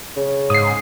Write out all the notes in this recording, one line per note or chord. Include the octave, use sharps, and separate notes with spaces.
C#3
G#2 D#6 C7